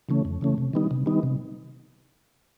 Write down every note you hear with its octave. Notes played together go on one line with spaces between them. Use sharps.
C#3 E3 A3 C#4
F2
C#3 E3 A3 C#4
C3
D#3 G3 B3 D#4
C3
D#3 G3 B3 D#4
C3